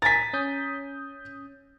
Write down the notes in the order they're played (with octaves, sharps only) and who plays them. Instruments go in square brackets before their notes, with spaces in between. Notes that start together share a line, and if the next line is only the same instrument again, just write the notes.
[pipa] A#4 G#5 [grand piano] A6 B6
[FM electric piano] C#4 D#6 G6